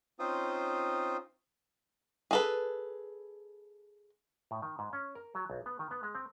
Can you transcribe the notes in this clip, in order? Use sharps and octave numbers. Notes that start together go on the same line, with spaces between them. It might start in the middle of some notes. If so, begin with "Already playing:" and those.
C4 C#4 D#4 F4 C5 D#6
G#4 A4 B4
A2
D#3
G#2
C#4
A#4
F#3
B1
B3
D#3
B3
G#3
C4